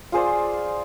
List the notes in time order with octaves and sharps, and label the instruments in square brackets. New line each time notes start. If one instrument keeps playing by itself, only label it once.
[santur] F4 G#4 C5 D5